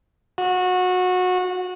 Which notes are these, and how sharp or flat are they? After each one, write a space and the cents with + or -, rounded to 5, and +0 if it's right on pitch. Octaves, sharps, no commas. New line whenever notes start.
F#4 -25